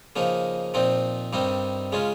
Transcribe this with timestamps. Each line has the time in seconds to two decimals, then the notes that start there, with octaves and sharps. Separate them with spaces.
0.16 C#3 F3 A#3 D#4
0.74 A#2 F3 C4 D#4
1.33 G2 D#3 G3 C4 D#4
1.92 C#3 G#3 C#4 F4